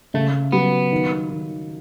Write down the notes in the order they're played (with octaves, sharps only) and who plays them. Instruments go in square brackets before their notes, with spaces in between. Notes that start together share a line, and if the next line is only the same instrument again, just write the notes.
[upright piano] C#3 [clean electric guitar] A3
[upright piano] F#3 [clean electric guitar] B3
[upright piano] D#3
D#3